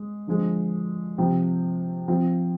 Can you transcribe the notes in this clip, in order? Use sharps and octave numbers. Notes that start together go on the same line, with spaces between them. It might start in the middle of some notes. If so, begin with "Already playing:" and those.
Already playing: G#3
D3 F3 G#3
C3 F3 C4 G4
F3 C4 F4